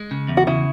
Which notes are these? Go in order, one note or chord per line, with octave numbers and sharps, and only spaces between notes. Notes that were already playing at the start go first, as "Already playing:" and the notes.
Already playing: G#3
C#3
E2
F#4
C#3 E4